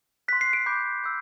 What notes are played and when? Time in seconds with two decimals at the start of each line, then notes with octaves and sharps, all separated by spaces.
0.28 C6 F#6 B6
0.41 C7
0.53 D7
0.66 B5 D6 G6
1.04 E6 G6